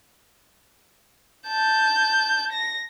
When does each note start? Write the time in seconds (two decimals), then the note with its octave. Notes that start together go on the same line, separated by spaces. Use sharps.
1.48 A5 G6
2.52 A#6